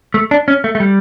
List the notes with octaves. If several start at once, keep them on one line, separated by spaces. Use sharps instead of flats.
A3
D4
C#4
A3
A3
G3